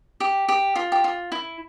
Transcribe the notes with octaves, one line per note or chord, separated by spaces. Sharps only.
G4
G4
F4
G4
F4
E4